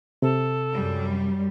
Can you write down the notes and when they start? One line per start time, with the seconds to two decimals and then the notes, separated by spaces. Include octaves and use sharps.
0.22 C3 A4
0.73 F#2 G3